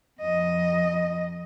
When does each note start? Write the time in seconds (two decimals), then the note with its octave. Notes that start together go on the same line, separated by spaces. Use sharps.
0.21 F2 D#5